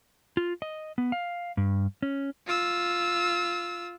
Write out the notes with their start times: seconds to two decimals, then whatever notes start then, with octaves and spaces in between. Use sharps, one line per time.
0.37 F4
0.62 D#5
0.98 B3
1.12 F5
1.57 G2
2.02 C#4
2.46 F4 E6